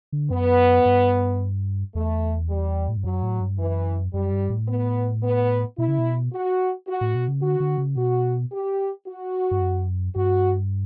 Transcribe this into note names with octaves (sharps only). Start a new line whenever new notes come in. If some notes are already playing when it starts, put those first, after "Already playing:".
D3
F#2 B3
G2
E2 A3
G3
A2
G2
F#2 F#3
A2
G2
F#2 E3
F#2 G3
G2
A2
B3
B3
B2 E4
C#3
B2
F#4
F#4
A2
B2
C#3
D3 F#4
D3
C#3
B2 F#4
G4
F#4
G2
F#2
G2 F#4